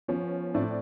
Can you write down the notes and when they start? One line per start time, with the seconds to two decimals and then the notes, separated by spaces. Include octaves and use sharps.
0.08 F3 B3 C#4
0.54 A2 C4 D4